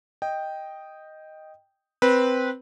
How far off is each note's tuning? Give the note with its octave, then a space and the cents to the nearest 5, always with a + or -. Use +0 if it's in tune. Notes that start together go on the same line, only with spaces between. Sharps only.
D#5 +0 G5 +0
C4 -10 B4 -15